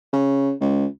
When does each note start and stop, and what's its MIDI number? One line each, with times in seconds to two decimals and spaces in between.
0.13 0.52 49
0.60 0.86 37